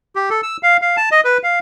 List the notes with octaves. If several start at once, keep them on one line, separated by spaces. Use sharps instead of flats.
G4
A4
E6
F5
F5
A5
D#5
B4
F5